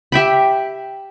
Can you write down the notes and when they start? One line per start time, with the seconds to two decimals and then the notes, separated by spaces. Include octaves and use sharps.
0.12 G4 E5 G5 B5